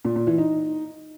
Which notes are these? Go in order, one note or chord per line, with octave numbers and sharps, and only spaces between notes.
A#2
A#2
E3
D#4